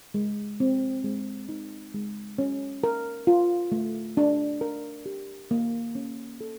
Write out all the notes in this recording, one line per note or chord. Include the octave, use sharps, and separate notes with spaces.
G#3
C4
G#3
D#4
G#3
C#4
A#4
F4
A3
D4
A#4
G4
A#3
C#4
A4